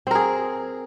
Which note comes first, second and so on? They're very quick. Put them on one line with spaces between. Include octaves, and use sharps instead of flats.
C4 A#4 G#4